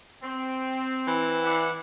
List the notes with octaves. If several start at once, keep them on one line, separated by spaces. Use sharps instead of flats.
C4
E3
E4 D5 F#5